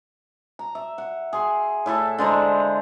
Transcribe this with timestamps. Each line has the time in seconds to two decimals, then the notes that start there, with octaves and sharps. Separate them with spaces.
0.59 A#5
0.75 E5
0.98 F#5
1.33 G#4 C6
1.86 A2 E4 A4
2.18 D3 G#3 C5 A#5